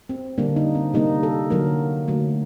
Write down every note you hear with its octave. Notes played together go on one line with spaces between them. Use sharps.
C4
D3 G3 A#3 D4
D#4
C4
C3 G3 A#3 D#4
A4
D3 F#3 A#3 A#4
D3 F#3 A3